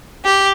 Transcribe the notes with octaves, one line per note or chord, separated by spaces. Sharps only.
G4